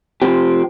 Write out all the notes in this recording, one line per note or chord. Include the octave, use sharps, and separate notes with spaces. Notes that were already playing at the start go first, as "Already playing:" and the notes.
C3 F3 C4 G4